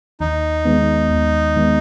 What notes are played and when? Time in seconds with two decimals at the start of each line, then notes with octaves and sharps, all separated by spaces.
0.20 D#2 D#4
0.65 D#3 G#3 B3
1.10 D#2
1.56 D#3 G#3 B3